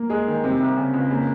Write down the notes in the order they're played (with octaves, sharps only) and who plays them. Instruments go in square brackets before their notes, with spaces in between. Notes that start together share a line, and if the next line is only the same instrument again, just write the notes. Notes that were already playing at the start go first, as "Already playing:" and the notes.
Already playing: [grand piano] A#3
[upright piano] G#3 [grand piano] G#4
[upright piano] D#3
[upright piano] C3 [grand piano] C4
[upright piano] C2
C#3
C#2
[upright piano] C#3 [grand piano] A#3